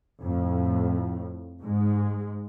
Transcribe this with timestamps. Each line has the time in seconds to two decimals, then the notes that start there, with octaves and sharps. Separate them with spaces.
0.23 F2 A2
1.64 G#2 G#3